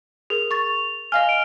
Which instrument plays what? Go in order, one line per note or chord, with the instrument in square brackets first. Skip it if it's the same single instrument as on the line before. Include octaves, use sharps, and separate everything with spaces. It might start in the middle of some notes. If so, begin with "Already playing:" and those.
[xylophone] G#4 A#4 [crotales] F7
[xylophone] C#6 A6
[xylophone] D#5 F5 G#5 [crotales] F6
[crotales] D7